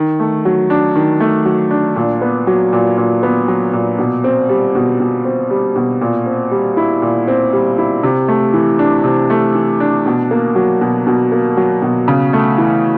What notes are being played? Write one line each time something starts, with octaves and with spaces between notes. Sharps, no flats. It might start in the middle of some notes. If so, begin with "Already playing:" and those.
Already playing: D#3
A3
F#3
D4
D#3
A3
F#3
D4
A#2
B3
F#3
A#2
A#2
B3
F#3
A#2
B2
C4
G3
B2
B2
C4
G3
B2
A#2
C4
G3
E4
A#2
C4
G3
E4
C3
A3
E3
D4
C3
A3
E3
D4
B2
A#3
F#3
B2
B2
A#3
F#3
B2
C#3
A3
E3